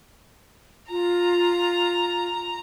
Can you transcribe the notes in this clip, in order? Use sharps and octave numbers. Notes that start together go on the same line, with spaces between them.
F4 A#5